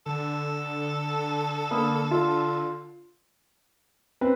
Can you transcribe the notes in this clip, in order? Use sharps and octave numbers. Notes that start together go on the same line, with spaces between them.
D3 A4
A#3 B5 D#6
F4
C4 B4